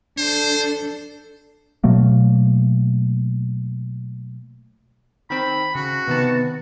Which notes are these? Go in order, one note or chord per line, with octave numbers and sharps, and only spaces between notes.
D4 A4 C5
B2 F#3 A3 A#3
D#3 C4 B5
C#3 F#4
C3 D#3 B3 A5